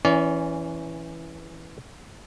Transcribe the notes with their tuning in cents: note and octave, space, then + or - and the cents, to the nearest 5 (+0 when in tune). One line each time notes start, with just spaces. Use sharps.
E3 +0 C#4 +0 D5 -35